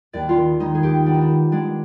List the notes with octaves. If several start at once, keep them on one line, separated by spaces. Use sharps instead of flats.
D#2 D5
F4
D#3
G#3 D#4
G#4
D#2 G4
B3 D4
D#4
D4
D#3
G#3 D4